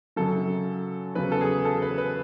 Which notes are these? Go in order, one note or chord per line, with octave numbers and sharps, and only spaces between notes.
F#2 C#3 F#3 A4
E2 C#3 F#3 B4
A4
G#4
A4
B4
B4